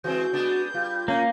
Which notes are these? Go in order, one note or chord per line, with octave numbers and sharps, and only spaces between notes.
E3 G#3 C4 F#4 G6
G#3 B3 D4
G3 F4
A#3 C#4